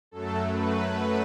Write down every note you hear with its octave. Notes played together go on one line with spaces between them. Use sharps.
F#2 F#3 A3 A4
B4